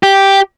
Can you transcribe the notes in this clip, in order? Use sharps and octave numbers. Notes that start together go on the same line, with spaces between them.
G4